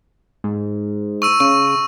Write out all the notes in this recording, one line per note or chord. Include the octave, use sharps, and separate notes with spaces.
G#2
C#6 E6 D#7
C#3 C#6